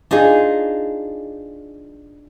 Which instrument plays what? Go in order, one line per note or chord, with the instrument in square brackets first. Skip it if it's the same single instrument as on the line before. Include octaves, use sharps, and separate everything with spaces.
[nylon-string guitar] D4 D#4 F4 G#4